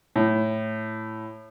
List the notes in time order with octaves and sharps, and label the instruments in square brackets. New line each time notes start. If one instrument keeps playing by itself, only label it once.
[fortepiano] A2